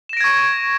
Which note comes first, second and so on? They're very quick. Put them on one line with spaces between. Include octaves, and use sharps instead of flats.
E7 A#6 D7 G#6 C#6